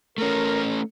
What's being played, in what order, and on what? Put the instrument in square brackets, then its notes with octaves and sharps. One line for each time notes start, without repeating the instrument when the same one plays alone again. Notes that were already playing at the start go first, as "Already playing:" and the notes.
[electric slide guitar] A3 C#4 [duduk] A#4